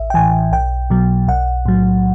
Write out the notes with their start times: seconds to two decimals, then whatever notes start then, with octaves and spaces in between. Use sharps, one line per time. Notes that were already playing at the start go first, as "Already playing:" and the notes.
Already playing: A1 E5
0.10 G5
0.14 A2 E3 G#5
0.52 B1 G5
0.90 B2 F#3
1.28 B1 F#5
1.66 A2 F#3